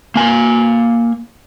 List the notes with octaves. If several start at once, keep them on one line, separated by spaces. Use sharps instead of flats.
A#3 G#5